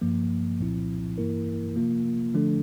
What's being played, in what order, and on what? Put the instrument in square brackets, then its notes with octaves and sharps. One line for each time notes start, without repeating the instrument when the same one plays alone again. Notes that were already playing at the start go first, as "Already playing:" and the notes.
[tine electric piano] G2 F3 A#3
C2 A#2 F3 C4 E4
G2 E3 A#3 E4 A#4
C3 F3 A#3 F4
D3 F3 A3 D4 A4